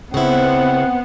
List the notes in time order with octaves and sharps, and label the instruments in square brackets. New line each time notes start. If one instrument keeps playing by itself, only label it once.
[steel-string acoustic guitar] C#3 E4 [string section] B3 C5 [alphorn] C4 [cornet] F#5